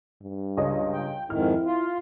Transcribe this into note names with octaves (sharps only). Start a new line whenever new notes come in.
G2
C#2 C#5 D#5
G5
F2 G#2 D#3 E4 F6
F4